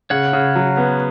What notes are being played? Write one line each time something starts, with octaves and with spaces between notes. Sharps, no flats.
C#3 C#5 F#5
C#3
F#3
B3